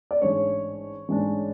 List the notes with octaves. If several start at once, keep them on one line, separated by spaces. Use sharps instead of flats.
D5
A1 G#2 G#3 D4 C#5
A1 G#2 G#3 D4